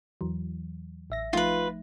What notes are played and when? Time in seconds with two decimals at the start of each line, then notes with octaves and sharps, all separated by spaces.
0.21 E2 E3 F#3
1.10 A1 E5 A#6
1.33 F3 A3 D#4 F4 B4